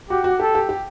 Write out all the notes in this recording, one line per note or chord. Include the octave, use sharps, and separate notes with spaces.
F#4 G4
F#4
G4 A4
G4
G4